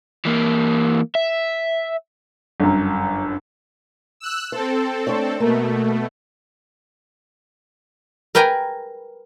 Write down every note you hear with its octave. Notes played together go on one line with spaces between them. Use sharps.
E3 A#3
E5
G1 F#2
E6 F#6
C4 A4 C5
A3 D4 C#5
B2 A3 A#3
A#4 B4 G5 G#5 A#5